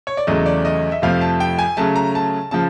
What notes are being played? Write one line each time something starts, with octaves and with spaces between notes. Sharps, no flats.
C#5
D5
E2 C#3 F#3 A3 D#5
D5
D#5
E5
F2 C3 F3 A3 F5
A5
G5
G#5
C#3 F#3 A3 A5
A#5
A5
C#3 F3 A5